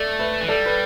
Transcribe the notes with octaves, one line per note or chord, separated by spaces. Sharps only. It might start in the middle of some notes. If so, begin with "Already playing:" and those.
Already playing: A3 A4 D5
B4 E5
E3
G3 A4 D5
B4